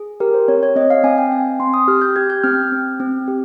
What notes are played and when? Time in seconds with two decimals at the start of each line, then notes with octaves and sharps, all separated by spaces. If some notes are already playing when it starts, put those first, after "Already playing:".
Already playing: G#4
0.20 G4 A#4
0.34 C5
0.48 C4 C#5
0.63 C#5
0.76 C4 D#5
0.90 F5
1.04 C4 G#5
1.18 G5
1.32 C4 G#5
1.60 C4 C6
1.74 D#6
1.88 G4 F6
2.02 G6
2.16 G4 G#6
2.30 G6
2.43 C4 F6
2.72 C4
3.00 C4
3.28 G4